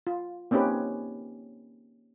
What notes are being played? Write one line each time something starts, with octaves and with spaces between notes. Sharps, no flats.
F4
A#3 C4 C#4 D#4 G4 B4